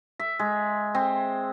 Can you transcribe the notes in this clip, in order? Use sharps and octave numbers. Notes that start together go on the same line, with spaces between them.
E5
G#3
C4